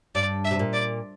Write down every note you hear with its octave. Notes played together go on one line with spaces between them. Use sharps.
G2 D5
E5
C3
A#2
D5